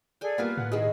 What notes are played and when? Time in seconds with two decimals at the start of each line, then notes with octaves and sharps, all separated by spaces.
0.21 G#4 A4 D5 G5 G#5
0.38 G3 A#3 B3 F4 B4 F5 G#5
0.57 A2 F#5
0.72 D#3 E4 G#4 D#5